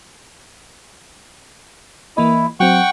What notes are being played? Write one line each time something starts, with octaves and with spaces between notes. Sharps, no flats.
E3 A#3 E4 D#5
F#3 C4 F#5 G5 C#6